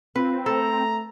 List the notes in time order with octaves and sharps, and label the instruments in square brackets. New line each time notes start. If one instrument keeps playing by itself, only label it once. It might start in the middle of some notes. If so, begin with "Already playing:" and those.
[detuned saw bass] C4 [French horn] F4 [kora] B4
[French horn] A3 [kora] A4 [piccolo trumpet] A#5